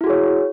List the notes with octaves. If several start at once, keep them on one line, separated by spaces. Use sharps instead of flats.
E4 F#4 G#4 C#5